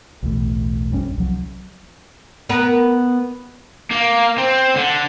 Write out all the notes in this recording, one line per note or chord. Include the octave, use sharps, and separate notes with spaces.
B1 E2 A2
A#1 F2 G3 C#4
C2 F3 F#3
B3 A#4 B4
A#3
C4
D3